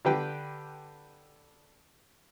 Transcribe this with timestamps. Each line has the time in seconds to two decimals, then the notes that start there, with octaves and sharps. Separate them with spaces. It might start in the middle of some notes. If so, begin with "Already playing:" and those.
0.05 D3 G4 B4 G5